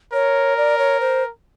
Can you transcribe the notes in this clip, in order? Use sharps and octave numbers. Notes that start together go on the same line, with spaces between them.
A#4 C#5
D5
C#5
C5